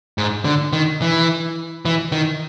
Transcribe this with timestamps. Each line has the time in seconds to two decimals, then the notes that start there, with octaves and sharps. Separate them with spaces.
0.18 G#2
0.45 D3
0.73 D#3
1.02 E3
1.85 E3
2.12 D#3